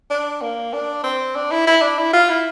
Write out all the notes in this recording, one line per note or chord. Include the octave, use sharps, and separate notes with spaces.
D4
A#3
D4
C4
D4
E4
E4
D4
E4
F4
E4